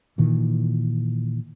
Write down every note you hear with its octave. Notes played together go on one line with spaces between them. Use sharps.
A#2 D#3 E3